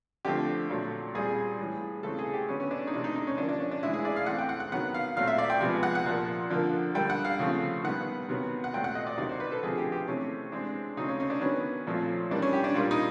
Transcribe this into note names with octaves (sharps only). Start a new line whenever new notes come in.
D3 F3 A3 C4 G4
A#2 F#3 A3
A#2 G3 C4 G#4
A2 E3 G3
C#3 E3 A3 C4 A4
G#4
G4
D3 F#3 B3 C#4
C#4
D4
D#4
C3 E3 A3 D4
D#4
D#4
C#4
D3 F3 A#3 D4
D4
C#4
D4
A2 E3 G#3 E4
G#4
D5
F5
E3 A3 C4 F#5
G5
F#5
F#5
D#3 F#3 B3 F#5
F5
A#2 F#3 A3 C4 F5
E5
D5
G5
C3 F3 G#3 B3
F#5
F#5
A#2 F3 A#3
D3 F3 A#3
D3 G3 A#3 G5
F#5
F5
C#3 F3 A3 C4
D#3 G3 B3 F#5
C3 D#3 F#3 B3
F#5
A#2 F#3 A3 C4 G5
F#5
D#5
D5
C3 D#3 F#3 D5
C5
B4
A4
D3 F3 A3 C4 G#4
G4
G4
C3 E3 A3 C4 C#4
E3 G#3 C4 D4
C#3 F#3 A3 C4 D#4
C#4
C#4
D4
D#3 F#3 B3 C#4
A#2 F3 A3 C4
E3 G3 A#3 D4
C#4
G4
D4
A#2 G3 A#3 F4
D#4